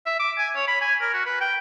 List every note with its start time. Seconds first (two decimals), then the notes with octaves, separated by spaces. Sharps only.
0.06 E5
0.19 D6
0.38 G#5
0.56 C#5
0.68 B5
0.81 G#5
1.01 A#4
1.14 F#4
1.26 B4
1.41 G5